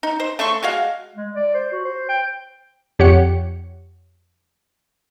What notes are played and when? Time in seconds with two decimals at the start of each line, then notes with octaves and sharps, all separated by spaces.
0.03 D#4
0.20 C5
0.39 A3 E5 C6 C#6
0.63 G#3 F#4 F5
1.16 G#3
1.35 D5
1.54 C5
1.72 F#4
1.85 C5
2.09 G5
2.99 F2 G4 C#5 F#5 C#7